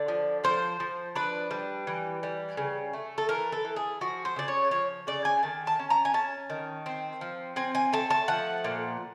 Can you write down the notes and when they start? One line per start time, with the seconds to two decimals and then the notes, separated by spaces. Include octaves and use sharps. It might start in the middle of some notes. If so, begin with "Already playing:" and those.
Already playing: D3 D5
0.08 F3
0.44 F3 C5
0.80 F3
1.16 D4 B4
1.51 G3
1.87 E3
2.23 G3
2.57 C#3
2.93 A3
3.18 A4
3.29 E3 A#4
3.52 A4
3.65 E3
3.76 G#4
4.01 F3 F#4
4.25 C5
4.36 C#3 D5
4.48 C#5
4.71 F3 C#5
5.07 C#3 D5
5.25 G#5
5.43 D#3 A5
5.67 A5
5.79 C#4
5.90 A#5
6.05 G#5
6.14 C#4 A5
6.50 D#3
6.86 C4
7.21 F3
7.56 C4 G#5
7.75 G#5
7.93 A3 A5
8.10 A5
8.28 F3 F#5
8.64 A#2